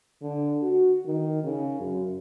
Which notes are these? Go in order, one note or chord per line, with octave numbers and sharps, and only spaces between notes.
D3
F#4
D#3
C#3
F#2